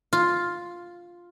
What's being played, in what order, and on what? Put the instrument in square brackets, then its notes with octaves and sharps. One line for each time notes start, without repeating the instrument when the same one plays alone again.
[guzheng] F4